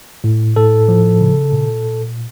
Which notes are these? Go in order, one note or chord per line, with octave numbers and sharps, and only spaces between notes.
A2
A2 A4
F3
C#3
A#2